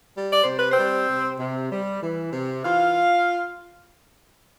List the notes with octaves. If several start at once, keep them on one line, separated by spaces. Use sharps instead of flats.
G3
D5
C3 C5
B4
C4 C5
G3
C3
C3
G3
E3
C3
E3 F4 F5